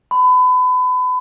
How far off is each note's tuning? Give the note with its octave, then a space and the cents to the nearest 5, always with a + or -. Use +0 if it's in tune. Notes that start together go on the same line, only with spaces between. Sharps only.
B5 +30